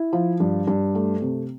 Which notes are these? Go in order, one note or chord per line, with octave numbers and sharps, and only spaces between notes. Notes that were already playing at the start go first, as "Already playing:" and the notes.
Already playing: E4
F3
G2
G2
A3
C3